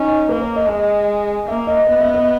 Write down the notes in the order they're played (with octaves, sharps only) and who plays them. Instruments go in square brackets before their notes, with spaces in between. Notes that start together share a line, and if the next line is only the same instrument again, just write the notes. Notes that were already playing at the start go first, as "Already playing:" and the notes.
Already playing: [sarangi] C#4 [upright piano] D#4
[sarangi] A#3 [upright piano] B4
[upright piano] C#5
D#5
[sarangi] G#3 [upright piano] D#5
[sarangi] A#3 [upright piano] E5
[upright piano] D#5
[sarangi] B3 [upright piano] D#5
[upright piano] E5
D#5